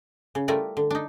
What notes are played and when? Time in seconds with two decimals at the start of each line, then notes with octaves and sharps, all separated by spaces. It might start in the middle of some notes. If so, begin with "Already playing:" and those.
0.35 C#3
0.48 G3 A3 E4 F4 A#4 D5
0.77 D3
0.91 D4 D#4